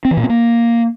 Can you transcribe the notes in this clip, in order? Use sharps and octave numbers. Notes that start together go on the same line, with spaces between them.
C4
E3
A#2
C4
A#3